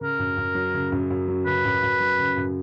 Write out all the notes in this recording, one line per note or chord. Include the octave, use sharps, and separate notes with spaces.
C#3 A#4
F#2
F#2
F#3
C#3
F#2
F#2
F#3
C#3 B4
F#2
F#2
F#3
C#3
F#2